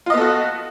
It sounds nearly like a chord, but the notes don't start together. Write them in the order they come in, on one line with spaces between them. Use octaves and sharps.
F4 D#5 B3 A4 F#4